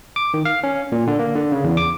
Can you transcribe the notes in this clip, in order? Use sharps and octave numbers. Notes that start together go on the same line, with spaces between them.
D6
D#3
F5
C#4
A#2
D3
A#3
D3
C#3
E2
D6